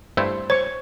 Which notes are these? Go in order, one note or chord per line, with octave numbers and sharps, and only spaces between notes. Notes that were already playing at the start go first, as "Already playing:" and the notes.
G2 A3 E4 C5
C5 C#5 C#6